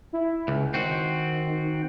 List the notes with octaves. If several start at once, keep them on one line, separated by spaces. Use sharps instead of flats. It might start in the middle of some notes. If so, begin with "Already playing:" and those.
E4
C#2
D#3 C4 F#4